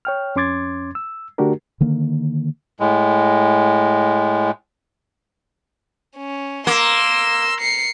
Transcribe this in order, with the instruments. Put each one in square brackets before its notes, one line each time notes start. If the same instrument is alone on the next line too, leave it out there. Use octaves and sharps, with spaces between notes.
[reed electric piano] C#5 G5 F6
F2 C#4 C6 D6 G#6 A6
E6
D3 A3 D4 F#4 G4 A#4
[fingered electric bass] D3 D#3 A#3
[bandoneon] A2 G#3
[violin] C#4
[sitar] A#3 [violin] C6 E6
[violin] C7 C#7